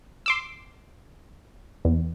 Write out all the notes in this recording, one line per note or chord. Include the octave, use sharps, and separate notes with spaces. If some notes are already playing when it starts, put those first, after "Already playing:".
C6 D6 E6
E2